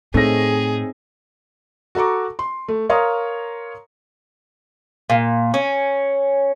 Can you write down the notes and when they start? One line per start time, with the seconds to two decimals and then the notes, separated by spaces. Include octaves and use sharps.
0.14 A2 A3 C4 D#4 G#4 C#5 A#6
1.95 F#4 A4 A#5 C#6 D6
2.39 C6
2.68 A3
2.89 A#4 C#5 F5 A#5 C6 D#6
5.10 A#2
5.54 C#4